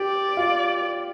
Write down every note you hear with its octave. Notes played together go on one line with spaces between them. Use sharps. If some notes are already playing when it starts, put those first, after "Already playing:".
Already playing: G4 D5
F4